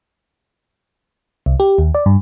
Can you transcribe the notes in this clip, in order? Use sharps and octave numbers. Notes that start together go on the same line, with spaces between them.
C2
G4
D#2
D5
G2